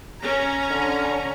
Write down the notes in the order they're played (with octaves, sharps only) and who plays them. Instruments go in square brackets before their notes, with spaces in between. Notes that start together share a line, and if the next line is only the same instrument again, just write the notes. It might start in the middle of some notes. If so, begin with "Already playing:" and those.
[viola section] C#4 A#5
[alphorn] D3